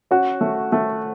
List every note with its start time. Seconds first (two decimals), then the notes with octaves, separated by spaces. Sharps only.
0.11 C#4 F#4
0.41 A3
0.72 A3